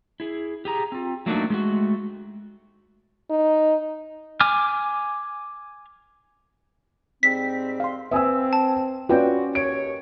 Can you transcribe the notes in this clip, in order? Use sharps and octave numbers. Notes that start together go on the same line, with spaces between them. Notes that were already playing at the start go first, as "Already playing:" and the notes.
E4 G#4
G4 G#4 A#5
C4 F4
F#3 A3 A#3 D4 D#4 F#4
G#3 A3 F#4
D#4
G#5 D6 F6
G#2 G3 C4 B6
F5 C6
C4 B4 E5 G#5 D#6 E6
A5
C#4 F4 F#4 B4 D5 G5
D#2 C#5 D7